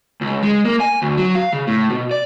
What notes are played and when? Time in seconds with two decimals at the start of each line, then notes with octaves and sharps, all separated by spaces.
0.21 C#2
0.43 G#3
0.65 A#3
0.80 G#5
1.02 D2
1.17 F#3
1.35 F5
1.53 C#3
1.67 A2
1.90 B2
2.11 D5